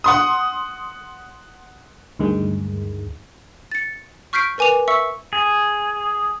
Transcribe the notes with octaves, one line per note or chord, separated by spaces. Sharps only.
F#5 C6 D#6
D2 G2 D#3 G#3
A6 C#7
C#6 F6 G6 B6 C7 D7
A#4 B4 G#5 D6 F7
E5 C#6 E6 B6 C#7
G#4